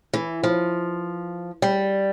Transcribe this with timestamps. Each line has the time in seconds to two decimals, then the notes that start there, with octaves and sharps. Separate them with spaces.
0.13 E3
0.43 F3
1.62 G3